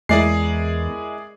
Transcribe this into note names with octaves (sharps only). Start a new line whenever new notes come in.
E2 G#3 E4 G#4 A#4 D5 C7